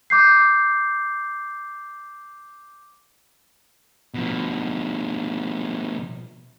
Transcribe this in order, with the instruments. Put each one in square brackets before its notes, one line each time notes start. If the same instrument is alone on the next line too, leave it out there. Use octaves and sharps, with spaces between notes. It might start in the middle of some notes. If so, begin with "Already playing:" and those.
[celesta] D6 G6 C7
[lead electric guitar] B2 F3